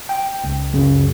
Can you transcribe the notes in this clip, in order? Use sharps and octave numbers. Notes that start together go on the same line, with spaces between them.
G5
C#2
C#2 F#2 C#3